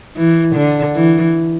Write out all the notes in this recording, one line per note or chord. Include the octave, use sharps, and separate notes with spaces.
E3
D3
E3